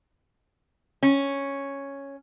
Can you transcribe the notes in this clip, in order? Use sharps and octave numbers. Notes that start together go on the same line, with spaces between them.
C#4